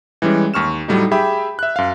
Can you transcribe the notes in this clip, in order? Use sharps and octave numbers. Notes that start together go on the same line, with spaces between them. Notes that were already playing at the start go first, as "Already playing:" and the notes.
E3 G3 G#3 C#4
D#2 C#6 F6 E7
A2 F#3 G3 A3 D#4
G4 G#4 E5 G5 B5
E5 F#6
F#2 F5